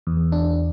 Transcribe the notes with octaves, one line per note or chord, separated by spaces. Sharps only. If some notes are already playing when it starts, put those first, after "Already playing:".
E2
D4